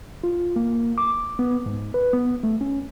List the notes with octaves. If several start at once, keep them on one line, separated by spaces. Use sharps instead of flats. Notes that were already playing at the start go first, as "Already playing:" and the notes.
F4
A#3
D6
B3
G#2
B4
B3
A3
C#4